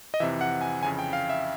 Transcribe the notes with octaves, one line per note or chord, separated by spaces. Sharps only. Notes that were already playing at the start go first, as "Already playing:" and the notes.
D#5
F2 C3 E3 E5
F#5
G#5
F2 C#3 E3 G#5
G5
F5
E5